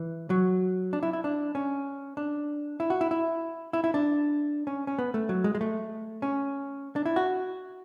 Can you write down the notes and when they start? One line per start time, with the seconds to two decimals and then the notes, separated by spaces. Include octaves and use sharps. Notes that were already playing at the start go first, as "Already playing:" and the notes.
Already playing: E3
0.30 F#3
0.93 D4
1.03 E4
1.13 E4
1.24 D4
1.55 C#4
2.17 D4
2.80 E4
2.90 F#4
3.01 E4
3.11 E4
3.73 E4
3.84 E4
3.94 D4
4.67 C#4
4.87 C#4
4.99 B3
5.14 A3
5.29 F#3
5.44 G#3
5.55 G#3
5.61 A3
6.22 C#4
6.96 D4
7.06 E4
7.16 F#4